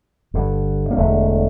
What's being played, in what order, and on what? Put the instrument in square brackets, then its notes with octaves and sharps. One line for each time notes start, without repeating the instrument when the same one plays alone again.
[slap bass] G1 G2 D3
A#3
E1 E2 D3 A3